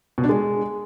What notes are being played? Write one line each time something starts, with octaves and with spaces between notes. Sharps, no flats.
B2
D4
G#3